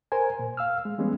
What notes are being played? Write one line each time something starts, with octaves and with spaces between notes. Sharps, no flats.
A#4 C5 G#5
A#2
F5 E6 F6
G#3
E3 G3 G#3 B3 C#4